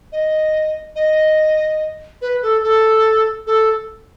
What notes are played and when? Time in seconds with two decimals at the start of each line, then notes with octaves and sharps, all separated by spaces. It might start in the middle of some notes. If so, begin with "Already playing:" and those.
0.12 D#5
0.96 D#5
2.22 B4
2.43 A4
2.64 A4
3.47 A4